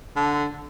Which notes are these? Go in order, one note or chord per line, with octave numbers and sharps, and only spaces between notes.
D3